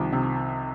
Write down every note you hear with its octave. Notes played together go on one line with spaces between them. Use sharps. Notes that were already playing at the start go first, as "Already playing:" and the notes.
Already playing: C2 D#3 F3
C3